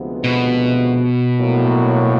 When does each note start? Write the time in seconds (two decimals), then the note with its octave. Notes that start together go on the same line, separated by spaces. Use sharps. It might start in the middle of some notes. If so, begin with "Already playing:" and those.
Already playing: D2 C3 F3 G#3 B3
0.24 B2
1.38 A#1 A2 F#3 A#3